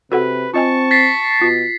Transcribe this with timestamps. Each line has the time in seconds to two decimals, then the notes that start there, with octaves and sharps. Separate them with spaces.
0.12 C3 F#4 A4 B4 F#5
0.54 C4 F4 D#5 G#5 A5 C#6
0.91 A6 B6 C7
1.41 B2 F4